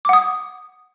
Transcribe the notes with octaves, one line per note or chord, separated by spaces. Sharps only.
F#5 D6 D#6